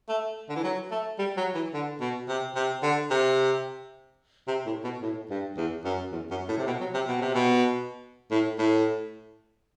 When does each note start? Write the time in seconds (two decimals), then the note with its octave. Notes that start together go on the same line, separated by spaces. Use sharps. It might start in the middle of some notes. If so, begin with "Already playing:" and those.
0.09 A3
0.49 D3
0.56 E3
0.64 F#3
0.91 A3
1.19 G3
1.37 F#3
1.55 E3
1.74 D3
2.00 B2
2.29 C3
2.56 C3
2.83 D3
3.10 C3
4.48 C3
4.66 A2
4.84 B2
5.02 A2
5.30 G2
5.57 E2
5.85 F#2
6.12 E2
6.31 F#2
6.49 A2
6.58 C3
6.67 B2
6.81 F#3
6.94 C3
7.08 B2
7.22 C3
7.35 B2
8.31 A2
8.59 A2